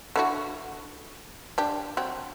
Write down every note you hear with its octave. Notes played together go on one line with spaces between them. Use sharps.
D3 E4 F#4
D4 G4
F#3 C4